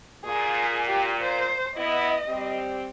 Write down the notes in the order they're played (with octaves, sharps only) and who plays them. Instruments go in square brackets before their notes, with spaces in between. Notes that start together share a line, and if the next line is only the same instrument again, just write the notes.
[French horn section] A#2 [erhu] G#4
[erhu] G4
C5
[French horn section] B3 E4 [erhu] D#5
[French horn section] G3 C4